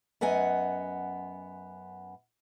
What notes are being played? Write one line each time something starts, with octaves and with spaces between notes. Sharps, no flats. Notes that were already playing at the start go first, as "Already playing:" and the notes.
F#2 B3 D#5 F#5 G#5